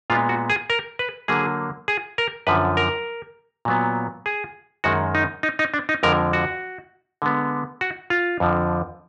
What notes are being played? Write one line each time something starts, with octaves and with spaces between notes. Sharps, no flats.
A#2 G#3 B3 F4
F#4
G#4
A#4
B4
D3 F#3 A#3 G#4
G#4
A#4
F#2 D3 F3 B4
A#4
A#2 F#3 B3
G#4
F#2 D#3 G#3 F#4
D#4
D#4
D#4
D4
D#4
F2 D3 F3 G#3 A#4
F#4
D3 G#3 B3
F#4
F4
F2 D3 F3